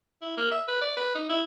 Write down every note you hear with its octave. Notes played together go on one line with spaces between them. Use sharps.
E4
A#3
E5
B4
D5
B4
D#4
E4